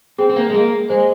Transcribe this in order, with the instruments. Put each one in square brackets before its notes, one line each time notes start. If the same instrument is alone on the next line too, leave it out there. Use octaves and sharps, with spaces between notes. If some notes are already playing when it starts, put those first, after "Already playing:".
[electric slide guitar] C4 [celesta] G#4
[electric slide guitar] C4
A#3
G#3
[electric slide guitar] A#3 [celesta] G#4
[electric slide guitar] G#3 [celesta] C5